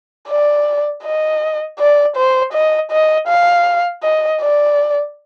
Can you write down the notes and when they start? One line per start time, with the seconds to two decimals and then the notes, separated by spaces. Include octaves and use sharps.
0.29 D5
1.04 D#5
1.79 D5
2.16 C5
2.53 D#5
2.91 D#5
3.28 F5
4.03 D#5
4.41 D5